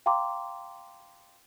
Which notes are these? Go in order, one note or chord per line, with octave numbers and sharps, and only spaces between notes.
F5 G5 A#5 C6 D6